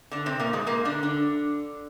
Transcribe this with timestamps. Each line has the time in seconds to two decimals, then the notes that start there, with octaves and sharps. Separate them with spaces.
0.11 D3 D4
0.26 C3 C4
0.39 A#2 A#3
0.53 G#2 G#3
0.66 A#2 A#3
0.85 D3 D4
1.03 D3 D4